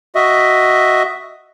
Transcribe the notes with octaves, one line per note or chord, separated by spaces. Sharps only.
F#4 D#5 E5